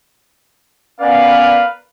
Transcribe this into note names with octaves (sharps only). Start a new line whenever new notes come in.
B3 C#4 A#4 B4 D5 F5